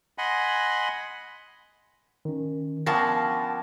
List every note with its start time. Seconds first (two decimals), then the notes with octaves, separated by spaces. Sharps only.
0.18 D#5 F#5 G#5 B5 C6
2.25 D#3 C#4
2.86 F3 B3 C#4 D4 A#4 G5 A5 A#6